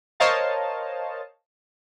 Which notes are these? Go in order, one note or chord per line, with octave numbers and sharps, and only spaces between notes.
A#4 C5 C#5 D#5 F5 A5